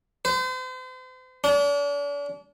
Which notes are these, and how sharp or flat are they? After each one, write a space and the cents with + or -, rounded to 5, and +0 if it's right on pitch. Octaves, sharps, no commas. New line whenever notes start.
C5 -40
D4 -40